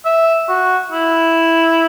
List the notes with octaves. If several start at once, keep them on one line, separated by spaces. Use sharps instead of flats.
E5
F#4
E4